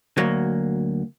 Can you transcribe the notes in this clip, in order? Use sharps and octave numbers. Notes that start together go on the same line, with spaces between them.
D2 F#3 A#3